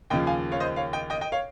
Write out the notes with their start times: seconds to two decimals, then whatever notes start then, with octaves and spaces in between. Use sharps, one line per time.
0.10 D#2 C#3 F3 D#5 G5
0.27 F5 G#5
0.52 C#5 F5
0.60 C5 D#5
0.76 C#5 F5
0.93 D#5 G5
1.10 D#5 G5
1.21 D#5 G5
1.32 C#5 F5